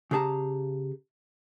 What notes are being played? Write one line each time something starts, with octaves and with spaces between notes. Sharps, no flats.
C#3 G4 G#4 A5 A#5